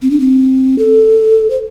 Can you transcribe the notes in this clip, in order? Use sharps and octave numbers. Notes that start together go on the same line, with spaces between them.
C4
D4
C4
A4
C5